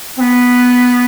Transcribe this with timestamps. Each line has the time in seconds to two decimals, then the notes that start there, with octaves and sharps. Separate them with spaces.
0.17 C4
0.20 B3